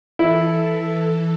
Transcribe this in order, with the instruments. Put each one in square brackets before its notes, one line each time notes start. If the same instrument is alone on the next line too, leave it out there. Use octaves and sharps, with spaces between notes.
[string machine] E3 A4 [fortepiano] E4